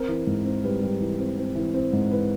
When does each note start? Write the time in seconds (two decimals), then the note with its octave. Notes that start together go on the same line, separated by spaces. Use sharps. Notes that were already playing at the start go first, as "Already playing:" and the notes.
Already playing: C4 A#4
0.08 E3
0.27 G#2
0.45 C4
0.64 G3 B4
0.82 G3
1.00 E3
1.19 C4
1.37 C4
1.55 E3
1.74 C4
1.93 G#2
2.11 E3 B4